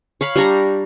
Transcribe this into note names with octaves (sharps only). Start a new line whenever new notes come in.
C#5 F5 B5
G3 D4 A#5 C#6